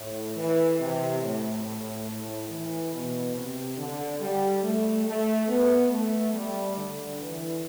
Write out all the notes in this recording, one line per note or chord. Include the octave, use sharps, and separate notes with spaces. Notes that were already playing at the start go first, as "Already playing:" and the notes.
Already playing: A2
E3
C3
A2
A2
A2
E3
B2
C3
D3
G3
A3
A3
B3
A3
G3
D3
E3